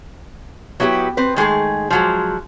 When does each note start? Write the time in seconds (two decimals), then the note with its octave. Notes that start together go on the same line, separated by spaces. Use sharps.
0.80 F#3 B3 E4 F#4 G4
1.17 C4 B4
1.36 D#3 G#3 A3 G#4
1.90 F3 F#3 G#3